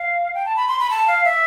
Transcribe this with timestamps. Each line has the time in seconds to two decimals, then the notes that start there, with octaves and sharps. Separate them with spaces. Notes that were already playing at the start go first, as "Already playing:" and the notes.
Already playing: F5
0.34 G5
0.45 A5
0.56 B5
0.68 C6
0.79 B5
0.90 A5
1.07 F5
1.24 E5